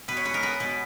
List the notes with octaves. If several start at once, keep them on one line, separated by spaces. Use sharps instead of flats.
B2 B4
C#5
G#3 B4
A#4
B3 B4
B2 B4